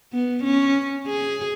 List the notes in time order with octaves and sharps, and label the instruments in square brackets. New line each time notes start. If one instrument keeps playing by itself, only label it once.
[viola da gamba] B3
C#4
G#4